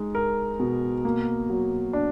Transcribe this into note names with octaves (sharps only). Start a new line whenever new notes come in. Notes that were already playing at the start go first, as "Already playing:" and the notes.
Already playing: G#3 D#4
A#4
B2
A#3
F#3
D4